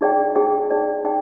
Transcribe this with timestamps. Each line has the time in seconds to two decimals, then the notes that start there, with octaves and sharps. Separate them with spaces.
0.01 D#4 G#4 D5 G5
0.35 D#4 G#4 D5 G5
0.70 D#4 G#4 D5 G5
1.04 D#4 G#4 D5 G5